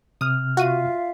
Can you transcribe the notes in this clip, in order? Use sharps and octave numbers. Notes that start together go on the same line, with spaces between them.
C3 D#6 F6
F4 F#4 E5 F5 D#7